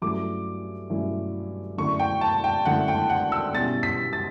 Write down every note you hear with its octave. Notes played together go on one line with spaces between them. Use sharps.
G2 F#3 A3 C#4 E4 D6
G2 F#3 A3 C#4 E4
F#2 D3 A3 E4 C#6
G5
A5
G5
F#2 D3 A3 E4 F#5
G5
F#5
E6
B2 G3 C#4 E4 A6
B6
A6